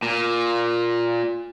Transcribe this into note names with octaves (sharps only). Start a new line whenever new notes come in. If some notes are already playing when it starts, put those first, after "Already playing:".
A#2